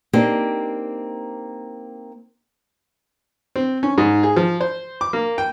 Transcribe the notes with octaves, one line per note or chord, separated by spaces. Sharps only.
A#3 C4 D4 D#4 G4
C4
C#4
G#2
G#4
F3
C5
D6
A#3
G5